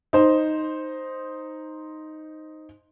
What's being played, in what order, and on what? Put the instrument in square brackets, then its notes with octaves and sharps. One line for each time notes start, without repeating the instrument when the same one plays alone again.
[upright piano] D#4 C5